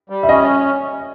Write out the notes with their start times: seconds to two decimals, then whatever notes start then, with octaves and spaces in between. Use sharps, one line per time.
0.10 G3
0.23 E5
0.29 C#4 D#5